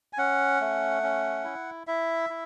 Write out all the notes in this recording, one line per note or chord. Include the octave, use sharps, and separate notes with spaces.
G#5
C#4 F#5
A3
C#4
E4
E4 E5
E4